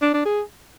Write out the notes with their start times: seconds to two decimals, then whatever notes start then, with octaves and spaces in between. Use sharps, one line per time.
0.02 D4
0.14 D4
0.25 G#4